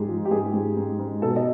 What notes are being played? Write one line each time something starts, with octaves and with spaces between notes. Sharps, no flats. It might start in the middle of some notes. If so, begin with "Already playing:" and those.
Already playing: G#2 G#3 G4 G#4
F3
G4
G#2 G#4
G#2
G#2
G#2
B2 A4
D#5